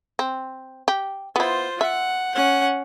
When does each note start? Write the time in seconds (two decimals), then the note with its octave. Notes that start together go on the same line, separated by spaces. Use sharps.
0.19 C4
0.88 G4
1.36 B3 E4 F4 C5
1.81 E5 F#5
2.35 C#4 F#5